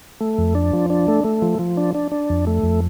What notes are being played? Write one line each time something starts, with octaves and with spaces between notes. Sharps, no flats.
A3
F2
D4
F3
D4
A3
A3
F3
F3
D4
D4
D4
F2
A3
F2